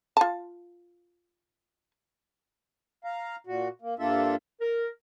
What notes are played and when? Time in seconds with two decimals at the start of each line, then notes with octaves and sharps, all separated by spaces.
0.17 F4 A5
3.04 F5 A#5
3.47 A#2 F#4
3.82 A#3
3.99 G2 A#3 D4 F4 A4 E5
4.61 A#4